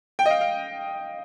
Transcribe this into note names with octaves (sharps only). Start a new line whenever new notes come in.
G5
D#5
F5
F5